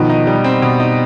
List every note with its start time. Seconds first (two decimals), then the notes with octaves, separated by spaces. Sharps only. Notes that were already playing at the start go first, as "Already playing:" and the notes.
Already playing: B2 D#3 F3
0.10 D#4
0.27 G3
0.44 C4
0.62 B2
0.80 D#4